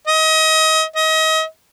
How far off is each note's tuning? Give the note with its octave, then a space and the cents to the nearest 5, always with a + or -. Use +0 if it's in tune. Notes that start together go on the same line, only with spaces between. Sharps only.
D#5 +30
D#5 +35